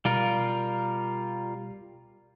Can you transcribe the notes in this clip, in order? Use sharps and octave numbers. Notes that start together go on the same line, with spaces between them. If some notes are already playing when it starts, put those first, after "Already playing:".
B2 G3 F4 A#4